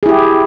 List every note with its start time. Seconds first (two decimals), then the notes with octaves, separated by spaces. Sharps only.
0.03 G#4
0.06 E4
0.09 G4